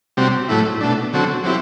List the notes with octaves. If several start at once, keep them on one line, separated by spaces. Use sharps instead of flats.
C3 G3 C4 F#4
A2 F#3 A3 E4
B2 A3 D4
D3 F#3 C4 F#4 A4
F#3 C4 E4 G4